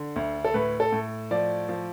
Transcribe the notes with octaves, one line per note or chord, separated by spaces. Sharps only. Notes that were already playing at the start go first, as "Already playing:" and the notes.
Already playing: D3
D2
A4
A2 B4
A4
A2
F3 D5
F3